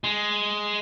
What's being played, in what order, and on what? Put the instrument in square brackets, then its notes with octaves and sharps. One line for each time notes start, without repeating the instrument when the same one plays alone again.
[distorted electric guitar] G#3